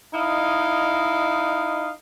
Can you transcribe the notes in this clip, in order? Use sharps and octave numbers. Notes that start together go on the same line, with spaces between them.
D#4 E4 D#5 F5